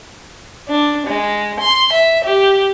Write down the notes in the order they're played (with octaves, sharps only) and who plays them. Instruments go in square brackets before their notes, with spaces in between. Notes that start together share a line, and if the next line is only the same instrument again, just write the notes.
[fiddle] D4
G#3
C6
E5
G4